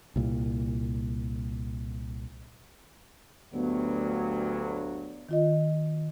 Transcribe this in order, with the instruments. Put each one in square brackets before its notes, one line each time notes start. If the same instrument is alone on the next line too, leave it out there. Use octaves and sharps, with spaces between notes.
[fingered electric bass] C2 A#2
[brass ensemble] D2 G2 F#3 [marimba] B3
[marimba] D#3 F4 D#5